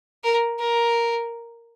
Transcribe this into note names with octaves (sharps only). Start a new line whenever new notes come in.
A#4
A#4